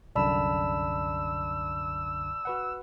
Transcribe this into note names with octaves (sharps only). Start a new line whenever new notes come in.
C2 F#2 D3 D5 A5 B5 E6
F#4 B4 F#5